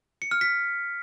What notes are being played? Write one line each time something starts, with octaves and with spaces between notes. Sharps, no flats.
C#7
F6
B6